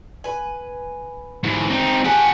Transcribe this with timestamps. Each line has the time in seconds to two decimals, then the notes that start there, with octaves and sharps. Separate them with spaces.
0.24 B4 G#5
1.44 G#2 E3
1.70 C4 D#4
2.04 G4 G#4 F#5 G#5 A5